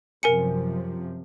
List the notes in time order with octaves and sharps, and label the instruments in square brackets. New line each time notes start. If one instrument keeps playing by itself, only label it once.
[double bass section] F#2 C3 F3 [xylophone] A#4 G#5 C#7